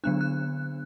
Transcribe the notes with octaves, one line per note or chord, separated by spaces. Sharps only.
D3 F#3 B3 D4 F#6
F#6